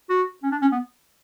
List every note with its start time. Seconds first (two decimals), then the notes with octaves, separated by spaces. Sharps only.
0.10 F#4
0.43 C#4
0.52 D4
0.62 C#4
0.72 B3